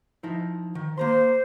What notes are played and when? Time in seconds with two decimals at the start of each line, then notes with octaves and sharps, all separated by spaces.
0.23 F3 D#4 E4
0.75 D#3
0.98 A#3 C5 A#5 C6